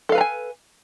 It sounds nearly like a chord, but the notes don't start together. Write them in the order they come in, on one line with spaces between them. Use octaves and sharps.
A4 F5 B4 A#5 G#5